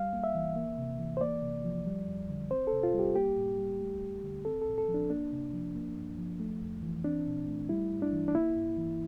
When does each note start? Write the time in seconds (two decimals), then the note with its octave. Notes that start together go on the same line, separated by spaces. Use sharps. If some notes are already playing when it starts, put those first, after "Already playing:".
Already playing: G3 F5
0.13 A#3
0.24 E5
0.35 E3
0.56 A#3
0.78 C3
0.99 E3
1.17 C5
1.21 A#3 D5
1.42 C3
1.64 F3
1.86 G3
2.08 F2
2.29 D3
2.51 C4 C5
2.67 A4
2.73 C3
2.83 F4
2.94 G3
2.99 G4
3.15 A#3 G4
3.37 A2
3.58 G3
3.80 A3
4.02 E2
4.23 D3
4.45 C4 A4
4.62 A4
4.67 A#2
4.78 A4
4.88 F3
4.94 D4
5.10 A#3 D4
5.32 C3
5.54 F3
5.75 A#3
5.97 G2
6.18 F3
6.40 A3
6.62 F2
6.83 E3
7.05 C4 D4
7.26 A#2
7.48 A3
7.69 G3 E4
7.91 G2
8.02 D4
8.12 E3
8.28 D4
8.34 A#3 E4
8.56 G2
8.78 E3